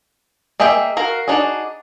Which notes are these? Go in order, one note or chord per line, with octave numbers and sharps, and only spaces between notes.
A#3 G#4 D#5 E5 G5
F#4 A#4 F5
D4 D#4 F#4 G#4